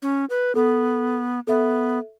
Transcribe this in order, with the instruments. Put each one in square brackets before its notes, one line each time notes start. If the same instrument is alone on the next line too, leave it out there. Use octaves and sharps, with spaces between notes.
[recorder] C#4
B4
[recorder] B3 [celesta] A4
[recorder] B3 [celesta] A4 E5